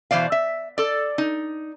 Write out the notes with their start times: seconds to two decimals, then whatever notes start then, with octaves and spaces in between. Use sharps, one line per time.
0.11 B2 E3 C5 D5 F5
0.32 E5
0.78 A4 D5
1.18 D#4